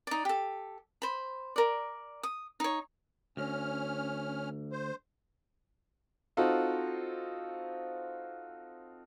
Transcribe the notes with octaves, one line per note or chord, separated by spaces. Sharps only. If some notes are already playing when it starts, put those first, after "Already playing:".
D#4 D5
G4 A4
C5 B5
A#4 D5
D#6
D#4 C#5
D2 C#4 F6
C5
C4 D#4 F4 F#4 A4